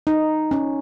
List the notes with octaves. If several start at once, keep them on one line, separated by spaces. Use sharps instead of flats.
D#4
C#4